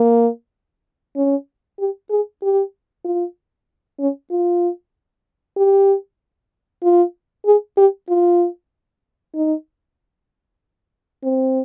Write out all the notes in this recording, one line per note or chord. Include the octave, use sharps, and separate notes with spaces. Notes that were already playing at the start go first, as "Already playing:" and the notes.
Already playing: A#3
C#4
G4
G#4
G4
F4
C#4
F4
G4
F4
G#4
G4
F4
D#4
C4